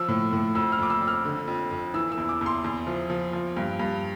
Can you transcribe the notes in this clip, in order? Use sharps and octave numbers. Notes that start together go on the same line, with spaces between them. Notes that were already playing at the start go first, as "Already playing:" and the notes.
Already playing: F3 E6
A2
A2
F2 E6
F6
F2 D6
E6
F2
F6
D3
F2
F2
E3 E6
E6
E2
D6
E2
C6
E2
F3
F3
F3
G2
G2